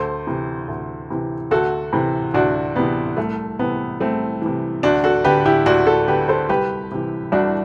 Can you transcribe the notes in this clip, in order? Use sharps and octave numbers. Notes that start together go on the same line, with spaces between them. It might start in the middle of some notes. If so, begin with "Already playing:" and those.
Already playing: D2 A4 C5
C3 E3
D2
C3 E3
D2 F#4 A4
C3 E3
D2 D4 F#4
C3 E3 B3
C2 A3
C3 E3 B3
C2 A3 C4
C3 E3
D2 D4 F#4
F#4 A4
D3 G4 B4
E4 G4
D2 D4 F#4
F#4 A4
D3 G4 B4
A4 C5
C2 G4 B4
C3 E3
C2 D4 F#4